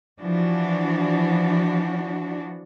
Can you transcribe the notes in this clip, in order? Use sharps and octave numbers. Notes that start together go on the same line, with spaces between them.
E3 F3 D4 F#4